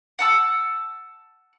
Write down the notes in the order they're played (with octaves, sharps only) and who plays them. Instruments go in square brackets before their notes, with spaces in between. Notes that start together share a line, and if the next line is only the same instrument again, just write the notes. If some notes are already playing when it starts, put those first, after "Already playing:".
[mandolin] F#5 A5 E6